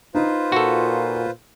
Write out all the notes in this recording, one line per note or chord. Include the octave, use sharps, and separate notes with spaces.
D#4 F4 B4 C5
A#2 F#4 A4